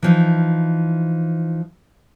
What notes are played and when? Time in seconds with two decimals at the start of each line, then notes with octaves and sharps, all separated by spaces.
0.03 E3 F3 D#4